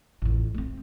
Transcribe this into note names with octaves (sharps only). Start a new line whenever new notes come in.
A1 F2
A3 C4